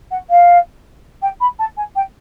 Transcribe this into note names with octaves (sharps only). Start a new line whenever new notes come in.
F#5
F5
G5
B5
A5
G#5
G5